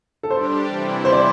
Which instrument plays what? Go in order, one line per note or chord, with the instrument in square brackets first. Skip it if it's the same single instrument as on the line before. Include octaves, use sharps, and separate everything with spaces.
[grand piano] A4
[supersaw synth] G3 D4 G4 [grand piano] C5
[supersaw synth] C3 E3 G3 E4
[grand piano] C5
D5